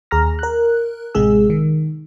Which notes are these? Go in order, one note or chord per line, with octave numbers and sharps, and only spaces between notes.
D#2 G#4 A#5 F6 A#6
A#4 F#6
A1 C3 G#3 G#4 E6
D#3